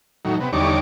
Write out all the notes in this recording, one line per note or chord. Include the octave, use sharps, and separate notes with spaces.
A2 D#3 F#3
C3 B3
E2 D3 G3 D#4 C#5 D6